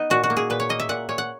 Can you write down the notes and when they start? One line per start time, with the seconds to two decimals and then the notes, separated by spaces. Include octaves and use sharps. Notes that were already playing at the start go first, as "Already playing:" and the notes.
Already playing: B3 D#4
0.10 A#2 F#4
0.23 F#4
0.30 A#3
0.37 G#4
0.50 A#2 B4
0.60 C#5
0.69 A#3 D#5
0.80 E5
0.89 A#2 F#5
1.09 A#2 C#5
1.18 F#5